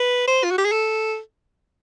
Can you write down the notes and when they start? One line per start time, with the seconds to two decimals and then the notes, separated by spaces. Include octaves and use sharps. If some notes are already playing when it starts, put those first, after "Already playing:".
Already playing: B4
0.27 C5
0.44 F4
0.51 F#4
0.58 G4
0.65 G#4
0.72 A4